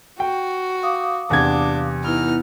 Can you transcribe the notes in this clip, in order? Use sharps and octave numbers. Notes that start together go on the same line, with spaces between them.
F#4 G5
F5 D6 D#6
E2 C3 D4 G#6
B3 D#4 E4 B4 F6